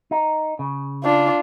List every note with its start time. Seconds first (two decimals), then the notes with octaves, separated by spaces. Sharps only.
0.11 D#4
0.59 C#3
1.04 D4 F4